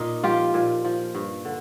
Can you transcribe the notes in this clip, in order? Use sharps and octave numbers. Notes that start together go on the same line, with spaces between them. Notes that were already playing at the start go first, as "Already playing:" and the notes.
Already playing: A#2 D#4
F3 F4 G4
A#2
F3
G2
D3